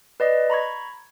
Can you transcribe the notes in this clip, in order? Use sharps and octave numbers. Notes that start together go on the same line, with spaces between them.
B4 D5 D#5
A#5 B5 C#6 G#6